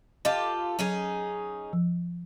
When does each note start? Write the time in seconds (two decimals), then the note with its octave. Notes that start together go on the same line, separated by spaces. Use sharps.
0.25 F4 G4 A4 D#5
0.79 F#3 C#4 D#4 G#4
1.73 F3